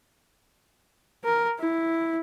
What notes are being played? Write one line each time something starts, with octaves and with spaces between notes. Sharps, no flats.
A#4
E4